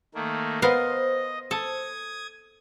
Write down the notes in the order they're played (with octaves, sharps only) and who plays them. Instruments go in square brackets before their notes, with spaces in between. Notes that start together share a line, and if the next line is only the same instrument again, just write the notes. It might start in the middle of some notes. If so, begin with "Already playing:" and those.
[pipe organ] D#3 A3 A#3
[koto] B3 A#4 F5 [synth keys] C5 [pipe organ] D#5
[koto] A4 [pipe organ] D#6 G#6